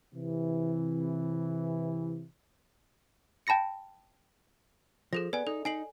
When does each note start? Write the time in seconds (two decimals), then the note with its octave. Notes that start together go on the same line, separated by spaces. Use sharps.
0.15 C3 E3
3.47 G5 A5 B5 A#6 C#7
5.13 F3 G#4 A4 A#6
5.33 B3 D5 G#5
5.47 D#4 A4
5.65 D#4 G#5 C7 F#7